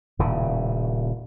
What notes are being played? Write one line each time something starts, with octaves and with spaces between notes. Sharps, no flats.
D#1 A2 C#3